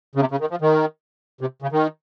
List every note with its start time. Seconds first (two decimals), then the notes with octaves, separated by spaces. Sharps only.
0.15 C#3
0.20 C3
0.31 C#3
0.41 D#3
0.51 F3
0.61 D#3
1.41 C3
1.62 C#3
1.72 D#3